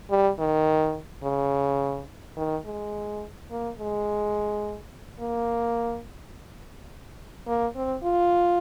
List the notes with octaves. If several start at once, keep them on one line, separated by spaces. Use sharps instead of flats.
G3
D#3
C#3
D#3
G#3
A#3
G#3
A#3
A#3
C4
F4